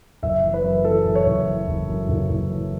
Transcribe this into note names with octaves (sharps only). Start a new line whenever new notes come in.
F#1 E5
E3
B4
F#2
E3 A4
F#1
C#5
F#1
E3
F#1
F#2
F#1
F#1
E3